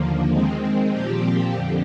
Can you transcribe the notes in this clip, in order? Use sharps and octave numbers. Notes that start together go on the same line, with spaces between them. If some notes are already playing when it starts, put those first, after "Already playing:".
Already playing: D#2 D3 F3 A#3
D#3 G#3 C4
A#2 F3 C4 G4
F2 D3